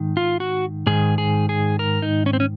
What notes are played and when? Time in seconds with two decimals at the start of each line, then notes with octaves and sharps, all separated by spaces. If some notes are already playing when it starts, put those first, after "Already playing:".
Already playing: G#2 D#3
0.17 F4
0.40 F#4
0.87 G#2 D#3 G#4
1.18 G#4
1.49 G#4
1.79 A#4
2.02 D#4
2.26 C#4
2.33 C4
2.40 C#4